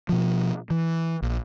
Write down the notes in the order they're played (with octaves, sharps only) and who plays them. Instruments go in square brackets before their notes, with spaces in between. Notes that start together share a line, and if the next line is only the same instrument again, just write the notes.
[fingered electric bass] B2 F3
E3
A#1